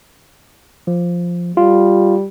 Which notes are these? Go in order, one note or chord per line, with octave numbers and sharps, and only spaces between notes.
F3
G3 F4